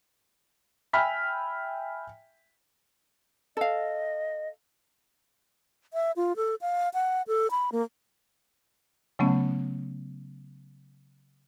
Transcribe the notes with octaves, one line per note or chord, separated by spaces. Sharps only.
E5 G5 G#5 B5 F6 B6
A4 D#5 F5
E5
F4
A4
F5
F#5
A4
B5
A#3
C#3 F#3 A3 B3 C#4